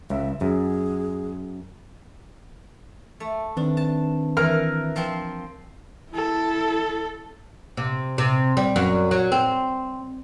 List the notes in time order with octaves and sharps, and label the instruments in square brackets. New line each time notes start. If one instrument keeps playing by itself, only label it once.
[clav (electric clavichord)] C#2 [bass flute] E5
[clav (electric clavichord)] F#2 [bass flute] G#4
[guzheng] A3
[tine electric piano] D#3 C4 B4 [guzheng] D4
[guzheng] A5
[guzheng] E3 [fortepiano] A#4 F6
[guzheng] F3 C4 C5
[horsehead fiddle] E4 A4
[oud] C3
C3
G3
F#2
F#3
C4